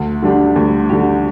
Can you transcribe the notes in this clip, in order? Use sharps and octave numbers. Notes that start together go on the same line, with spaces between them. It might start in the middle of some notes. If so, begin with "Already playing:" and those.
Already playing: D2
D3 G3 D4 G4
D2
D3 G3 D4 G4